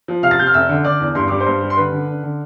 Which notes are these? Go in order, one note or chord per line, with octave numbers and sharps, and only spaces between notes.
F3
C3 F5 F6
A6
C3 G6
F6
F1 E5 E6
D3
D3 D5 D6
E2
G2 C6
G3 D6
C5 C6
G2
G3
C6
D3 B4 B5
D3
D3
D3